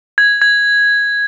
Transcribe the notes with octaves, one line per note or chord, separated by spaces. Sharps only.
G#6
G#6